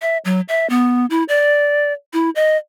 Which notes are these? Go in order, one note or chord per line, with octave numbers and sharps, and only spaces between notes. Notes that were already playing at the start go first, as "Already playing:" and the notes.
E5
F#3
E5
B3
E4
D5
E4
D#5